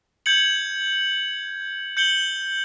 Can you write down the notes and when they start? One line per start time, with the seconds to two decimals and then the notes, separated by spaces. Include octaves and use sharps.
0.26 G6 G#6 C#7 F#7
1.97 G6 C#7 F#7 G7